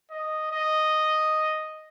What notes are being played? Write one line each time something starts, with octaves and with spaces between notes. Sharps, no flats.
D#5
D#5